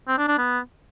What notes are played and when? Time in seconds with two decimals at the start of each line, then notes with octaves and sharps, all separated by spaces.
0.08 C4
0.18 D4
0.28 D4
0.38 B3